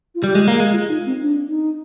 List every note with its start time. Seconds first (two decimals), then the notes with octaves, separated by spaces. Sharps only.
0.15 F4
0.23 G3 G4
0.35 G#3
0.48 A#3
0.60 G#3
0.73 F4
0.89 D#4
1.06 C4
1.22 D4
1.47 D#4